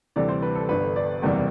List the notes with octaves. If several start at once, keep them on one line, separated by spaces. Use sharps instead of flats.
D2 C3 E3 G3 D5
C5
B4
A4
G1 G2 D3 B4
D5
F#1 E2 C3 E3 G3